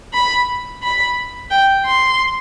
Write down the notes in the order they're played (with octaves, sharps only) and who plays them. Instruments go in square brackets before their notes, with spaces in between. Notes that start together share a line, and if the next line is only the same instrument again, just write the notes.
[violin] B5
B5
G5
C6